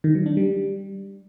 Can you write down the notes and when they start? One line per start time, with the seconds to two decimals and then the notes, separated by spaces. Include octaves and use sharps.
0.04 D#3
0.15 F#3
0.26 D4
0.37 G3